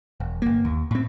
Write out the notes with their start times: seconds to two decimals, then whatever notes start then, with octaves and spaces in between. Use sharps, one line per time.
0.20 E1
0.42 G1 A#3
0.65 D#2
0.91 A2 C4